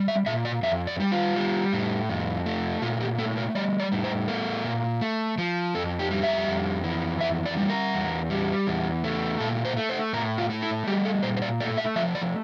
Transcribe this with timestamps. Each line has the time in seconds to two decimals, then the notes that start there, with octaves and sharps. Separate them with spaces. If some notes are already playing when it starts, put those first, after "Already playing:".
Already playing: G3
0.08 E5
0.26 A#2 E5
0.45 D5
0.63 F2 E5
0.87 D5
1.00 G3
1.12 F4
1.36 G3
1.73 A2
2.10 F2
2.46 A3
2.82 A#2 F4
3.00 G4
3.18 A3 A4
3.37 A#4
3.55 G3 D5
3.80 D5
3.92 A2
4.04 C5
4.28 A3 A#4
4.64 A#2
5.01 A3
5.38 F3
5.75 F2 A4
5.99 G4
6.11 G3
6.23 E5
6.48 F2
6.84 E3
7.21 F2 E5
7.46 D5
7.57 G3
7.70 A#4
7.94 E2
8.30 G3
8.67 E2
9.04 A3
9.40 A#2 A4
9.65 C5
9.77 A3
9.89 C5
10.13 A2 A#4
10.38 F4
10.50 A3
10.62 E4
10.87 G3 G4
11.05 A4
11.23 A#2 C5
11.37 C5
11.42 D5
11.60 A3 D5
11.78 E5
11.96 F3 E5
12.15 D5